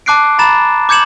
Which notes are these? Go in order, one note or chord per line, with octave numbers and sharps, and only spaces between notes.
A5 D6 F#6 C7 D7
A#5 B5 A6 E7
D6 G6 G#6 C#7 E7 F#7